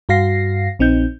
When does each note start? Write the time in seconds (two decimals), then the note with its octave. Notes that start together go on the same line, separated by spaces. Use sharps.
0.09 G2 F#4 F5 A#6 C7
0.79 A#1 C4 D#4 G6